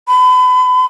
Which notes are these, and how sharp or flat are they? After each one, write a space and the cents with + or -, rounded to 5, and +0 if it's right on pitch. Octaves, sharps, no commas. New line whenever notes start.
B5 +35